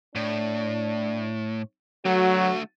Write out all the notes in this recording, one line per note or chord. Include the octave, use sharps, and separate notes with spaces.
A2 D4
D3 F#3 A3 F#4